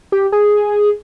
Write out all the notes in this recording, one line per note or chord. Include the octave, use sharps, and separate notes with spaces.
G4
G#4